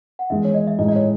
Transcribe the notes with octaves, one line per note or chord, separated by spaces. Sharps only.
F#5
E2 D#3 G#3 E5
C#5
D#5
E5
A2 G#3 D#4 D#5
D#5
C#5